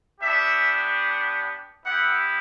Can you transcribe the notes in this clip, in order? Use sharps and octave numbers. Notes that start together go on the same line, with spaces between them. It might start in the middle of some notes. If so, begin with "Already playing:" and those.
B3 D4 G4 E5
B3 E4 G4 F#5